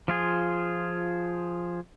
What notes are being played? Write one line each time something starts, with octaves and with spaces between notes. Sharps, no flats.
F3 F4 G#4